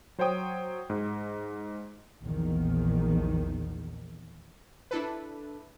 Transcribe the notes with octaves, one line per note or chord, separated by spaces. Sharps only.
F#3 C5 C#5 G5 D#6
G#2
A#1 E2 D#3
D4 E4 A4 B4